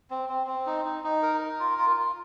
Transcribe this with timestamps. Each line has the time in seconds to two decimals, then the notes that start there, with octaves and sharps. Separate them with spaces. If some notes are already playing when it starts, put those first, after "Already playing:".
0.10 C4
0.29 C4
0.47 C4
0.66 D#4
0.85 D#4
1.04 D#4
1.22 A#4
1.41 A#4
1.60 F4
1.78 F4
1.96 F4